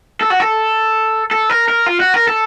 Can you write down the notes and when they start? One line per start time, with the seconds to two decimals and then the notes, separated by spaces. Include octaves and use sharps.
0.21 A4
0.30 F#4
0.40 A4
1.31 A4
1.50 A#4
1.68 A#4
1.86 F4
2.00 F#4
2.14 A#4
2.28 A4